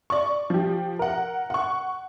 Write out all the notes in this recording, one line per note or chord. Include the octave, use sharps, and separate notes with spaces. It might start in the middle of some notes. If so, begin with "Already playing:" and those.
D5 C#6
F3 G4
A#4 F#5
F#5 C#6